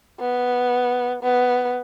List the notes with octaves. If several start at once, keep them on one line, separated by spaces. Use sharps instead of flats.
B3
B3